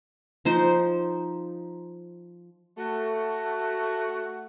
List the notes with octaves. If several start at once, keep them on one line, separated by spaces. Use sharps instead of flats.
F3 D#4 C5
A3 F#4